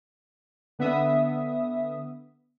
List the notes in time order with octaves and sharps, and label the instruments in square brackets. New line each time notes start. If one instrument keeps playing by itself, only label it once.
[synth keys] D3 B3 D4 E5 D#6